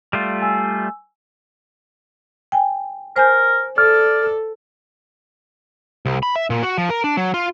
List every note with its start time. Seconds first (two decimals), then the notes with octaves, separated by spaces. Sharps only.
0.13 G3 A3 F4
0.42 G#5 E6
2.52 G5 G#5
3.16 A#4 C5 G#5 G6
3.78 A4 D5 F6
6.06 C2
6.23 B5
6.36 E5
6.50 A#2
6.63 F#4
6.78 F3
6.90 A#4
7.04 D4
7.17 F#3
7.34 F4